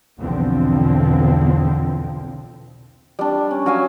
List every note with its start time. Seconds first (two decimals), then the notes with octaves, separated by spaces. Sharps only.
0.19 B1 E2 D3 F3 C4
3.19 G3 D4
3.51 C#4
3.66 F#3 F5 G#5